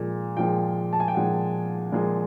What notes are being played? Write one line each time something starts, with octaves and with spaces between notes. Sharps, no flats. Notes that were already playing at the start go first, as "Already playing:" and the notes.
Already playing: A#2 F3 G#3
A#2 F3 G#3 G5
A5
G#5
G5
A#2 F3 G#3 F#5
A#2 F3 G#3